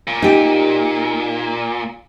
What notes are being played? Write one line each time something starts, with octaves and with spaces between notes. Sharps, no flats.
A#2
D#4 G4